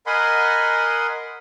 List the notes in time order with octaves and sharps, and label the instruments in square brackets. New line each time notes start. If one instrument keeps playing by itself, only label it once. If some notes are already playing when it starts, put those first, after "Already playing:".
[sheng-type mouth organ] A#4 D#5 F#5 G#5 B5 C6